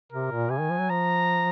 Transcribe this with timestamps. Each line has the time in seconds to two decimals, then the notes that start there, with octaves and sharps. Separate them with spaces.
0.12 C3 A#4
0.31 A#2
0.50 C3 G#5
0.60 D#3
0.70 F3
0.79 F#3
0.90 F3 A#5